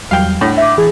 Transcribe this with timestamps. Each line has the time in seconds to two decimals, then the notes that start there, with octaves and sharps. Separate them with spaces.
0.11 E2 F#3 G3 F5 G5
0.41 A2 D4 F#5
0.57 E5 D6
0.78 E3 G#4 G#6 A6